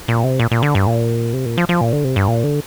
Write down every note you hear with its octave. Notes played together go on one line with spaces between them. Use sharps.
A#2
C3
A#2
A#2
D3
G2
A#2
C3
A#2
F3
F3
A#2
D3
C3
G2
A#2
D3